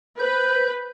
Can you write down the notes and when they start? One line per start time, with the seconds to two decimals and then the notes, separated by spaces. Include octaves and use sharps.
0.20 B4 C5 G6